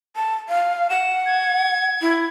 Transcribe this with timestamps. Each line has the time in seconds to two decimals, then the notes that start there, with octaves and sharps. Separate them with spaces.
0.16 A5
0.49 F5
0.90 F#5 E7
1.26 G#6
2.01 E4